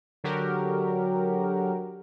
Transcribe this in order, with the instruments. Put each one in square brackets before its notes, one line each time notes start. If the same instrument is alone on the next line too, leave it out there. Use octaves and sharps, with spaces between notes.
[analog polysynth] D3 F#3 F#4 G4 A#4